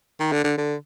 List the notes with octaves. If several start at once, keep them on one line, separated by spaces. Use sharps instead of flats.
D#3
D3
D3
D3